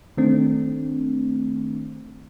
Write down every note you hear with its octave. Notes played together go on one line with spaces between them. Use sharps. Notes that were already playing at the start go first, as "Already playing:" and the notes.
D#3 A3 C4 D4